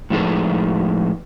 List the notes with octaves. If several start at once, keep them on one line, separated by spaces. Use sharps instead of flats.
A2 F3 G#3 D#4 A4 B4